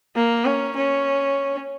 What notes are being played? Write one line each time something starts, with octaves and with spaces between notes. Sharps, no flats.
A#3
C#4
C#4